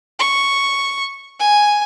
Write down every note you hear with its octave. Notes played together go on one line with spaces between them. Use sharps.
C#6
G#5